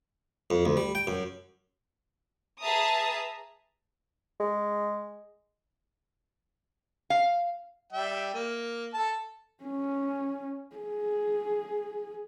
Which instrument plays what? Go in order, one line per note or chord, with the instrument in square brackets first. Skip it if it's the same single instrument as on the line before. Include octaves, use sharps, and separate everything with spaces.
[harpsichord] F2
D2
G3
G5
F#2
[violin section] G#4 B4 E5 A5 A#5 D#6
[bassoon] G#3
[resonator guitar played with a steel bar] F5
[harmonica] G3 E5 G5
A#3
A4 A5
[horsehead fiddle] C#4
G#4